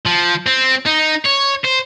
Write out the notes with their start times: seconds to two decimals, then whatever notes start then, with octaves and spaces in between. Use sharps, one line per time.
0.06 F3
0.47 C4
0.86 D#4
1.25 C#5
1.65 C5